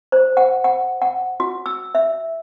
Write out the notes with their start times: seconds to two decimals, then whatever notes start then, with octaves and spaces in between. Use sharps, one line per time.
0.12 C5
0.37 F#5
0.64 F#5
1.02 F#5
1.40 F#4
1.66 E6
1.95 E5